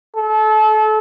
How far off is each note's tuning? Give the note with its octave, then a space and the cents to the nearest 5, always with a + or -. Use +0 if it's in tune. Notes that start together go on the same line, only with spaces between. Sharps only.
A4 -30